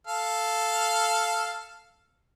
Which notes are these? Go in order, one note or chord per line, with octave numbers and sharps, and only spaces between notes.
A4 F5